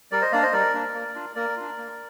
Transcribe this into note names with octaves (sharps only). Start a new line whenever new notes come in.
G3 A#4 D5
C5 D#5
A#3 D4 D5 F5
C5 D#5
G3 A#4 D5
A#3 D4
A#3
D4 F4
A#3 A#4 D5
D4 F4
A#3